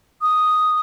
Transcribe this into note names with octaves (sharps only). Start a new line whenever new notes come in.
D#6